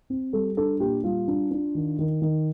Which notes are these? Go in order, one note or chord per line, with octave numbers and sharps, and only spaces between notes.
C4
G3 A4
D4 A4
A#2 G4
G3 F4
D4
D4
D#3
D#3
D#3